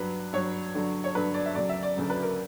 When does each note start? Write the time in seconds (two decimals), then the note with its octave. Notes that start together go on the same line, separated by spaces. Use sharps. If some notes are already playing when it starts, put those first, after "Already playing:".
Already playing: G2 F#3 B4
0.33 G2 F#3 C#5
0.74 G2 D3 F#3
1.04 C#5
1.14 G2 D3 F#3 B4
1.34 D5
1.46 E5
1.55 D2 C#3 F#3 D5
1.69 E5
1.83 D5
1.96 D2 C#3 F#3
2.10 B4
2.23 A#4